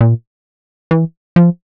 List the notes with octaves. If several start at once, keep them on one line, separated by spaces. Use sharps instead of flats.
A#2
E3
F3